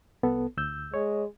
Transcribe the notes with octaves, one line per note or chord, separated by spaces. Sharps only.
C2 B3 A4
D2 E6 G6
G#3 C#5